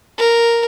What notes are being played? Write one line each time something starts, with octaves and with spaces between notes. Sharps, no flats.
A#4